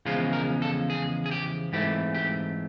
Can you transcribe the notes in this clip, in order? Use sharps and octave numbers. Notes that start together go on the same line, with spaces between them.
E2 C#3 F3 G#3 F4
A#4
A4
G#4
G#4
G4
G#2 E3 A3 C4 G4
G4